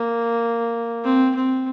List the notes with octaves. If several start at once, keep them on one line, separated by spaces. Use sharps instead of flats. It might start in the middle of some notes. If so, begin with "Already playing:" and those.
Already playing: A#3
C4
C4